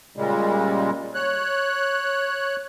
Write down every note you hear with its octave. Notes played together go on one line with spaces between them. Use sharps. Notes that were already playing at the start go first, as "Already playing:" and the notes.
A#2 C#3 G3 G#3
C#5 F#6